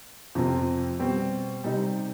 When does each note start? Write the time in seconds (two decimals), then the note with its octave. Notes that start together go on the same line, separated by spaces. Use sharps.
0.35 F2 C3 F3 C4
0.99 B2 G3 C4
1.64 C3 G3 C4 D#4